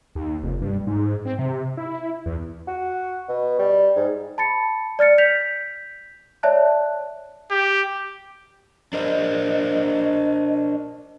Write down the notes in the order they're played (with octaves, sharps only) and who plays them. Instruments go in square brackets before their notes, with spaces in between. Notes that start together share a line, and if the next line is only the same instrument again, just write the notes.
[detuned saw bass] D#2
F1
G2
G#2
C4
C3
E4
E2
[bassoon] F#4
B2
G3
G#2
[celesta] A5 B5 A6 C#7
D5 F6 A6 C#7
G6 B6 F7
C#5 D5 E5 A5 F#6
[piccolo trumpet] G4
[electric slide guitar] D4 A#4 C5 [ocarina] D#5